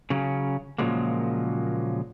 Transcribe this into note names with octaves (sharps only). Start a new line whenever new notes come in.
C#3 F#3 C#4
A#2 C#3 F3 F#3 G#3 A#3